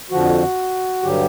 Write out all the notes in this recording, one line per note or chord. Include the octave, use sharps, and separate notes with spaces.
F2 D3 F3 F#4
G2 D3 F#3 G4